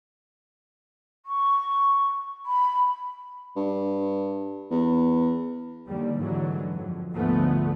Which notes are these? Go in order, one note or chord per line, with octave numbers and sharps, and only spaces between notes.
C#6
B5
G2
E2
D#2 D3 G3
G#2 D3 E3 F#3
F2
D2 G#2 D3 F3 A3 B3